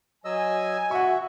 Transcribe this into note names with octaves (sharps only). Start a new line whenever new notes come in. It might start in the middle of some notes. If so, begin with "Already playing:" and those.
F#3 D#5 G#5 E6
F#4 E5 F#5 C#6